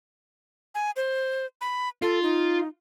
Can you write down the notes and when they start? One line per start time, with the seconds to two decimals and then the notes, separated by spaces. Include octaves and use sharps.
0.75 G#5
0.96 C5
1.61 B5
2.02 F4 A4
2.23 D#4